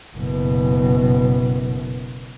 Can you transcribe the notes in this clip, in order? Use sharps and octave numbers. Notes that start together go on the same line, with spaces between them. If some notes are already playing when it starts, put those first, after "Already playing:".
F#1 B2